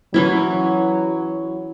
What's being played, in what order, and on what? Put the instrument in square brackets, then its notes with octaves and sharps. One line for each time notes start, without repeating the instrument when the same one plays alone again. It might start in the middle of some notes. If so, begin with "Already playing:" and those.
[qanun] E3 C#4 E4 [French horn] F#3